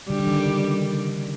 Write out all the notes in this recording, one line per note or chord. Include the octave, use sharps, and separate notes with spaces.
D3 G3
D3
D#3
C#3